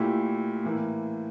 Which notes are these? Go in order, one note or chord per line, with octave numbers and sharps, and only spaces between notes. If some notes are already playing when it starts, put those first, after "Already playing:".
Already playing: A#2 A3 E4 G4
A2 E3 A#3